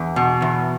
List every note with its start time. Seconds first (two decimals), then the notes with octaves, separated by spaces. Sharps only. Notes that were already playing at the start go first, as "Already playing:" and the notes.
Already playing: E2
0.16 B2
0.42 E2